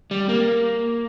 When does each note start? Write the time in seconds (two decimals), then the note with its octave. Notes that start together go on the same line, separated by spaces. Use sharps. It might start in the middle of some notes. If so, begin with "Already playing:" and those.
0.11 G3
0.29 A#3